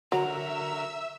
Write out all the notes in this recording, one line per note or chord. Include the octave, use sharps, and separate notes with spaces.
D3 F#3 F#4 A#4 E5 A#5 E6